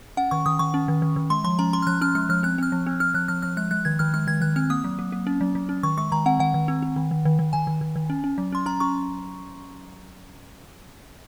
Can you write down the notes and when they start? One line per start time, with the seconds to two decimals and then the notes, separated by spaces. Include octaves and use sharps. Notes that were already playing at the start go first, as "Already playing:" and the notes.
0.17 C#4 F#5
0.31 D#3 C#6
0.46 D#3 D#6
0.59 D#3 C#6
0.74 C#4
0.88 D#3
1.02 D#3
1.16 D#3
1.30 G#3 C6
1.44 F3 C6
1.59 C#4 A#5
1.73 C#4 C6
1.82 F6
1.87 F3 F#6
2.01 C#4 F6
2.15 G#3 F6
2.29 F3 F6
2.43 C4 F#6
2.58 C4 F6
2.72 F3
2.87 C4
3.00 C4 F6
3.14 F3 F#6
3.28 F3 F6
3.42 F3 F6
3.57 G#3 F#6
3.71 G#3 F#6
3.85 D#3 G#6
3.99 D#3 F6
4.14 G#3 F6
4.27 D#3 G#6
4.41 D#3 F#6
4.56 C4 F6
4.70 A#3 D#6
4.84 F#3
4.99 A#3
5.12 A#3
5.27 C#4
5.41 F#3
5.55 F#3
5.69 C#4
5.83 D#3 C#6
5.98 G#3 C#6
6.12 D#3 A#5
6.26 C4 F#5
6.39 D#3 F#5
6.54 D#3
6.68 C4
6.82 C4
6.96 D#3
7.11 D#3
7.25 D#3
7.39 D#3
7.53 D#3 G#5
7.67 D#3
7.81 D#3
7.96 D#3
8.10 C#4
8.24 C#4
8.38 F#3
8.52 C#4 C6
8.66 C#4 A#5
8.80 C#4 C#6